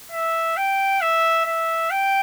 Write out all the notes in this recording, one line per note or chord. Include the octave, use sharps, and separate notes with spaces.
E5
G5
E5
E5
G5